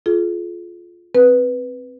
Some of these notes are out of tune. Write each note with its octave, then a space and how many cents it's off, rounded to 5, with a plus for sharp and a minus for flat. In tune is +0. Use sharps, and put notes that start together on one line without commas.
F4 +0 G#4 +45
C4 +0 B4 +0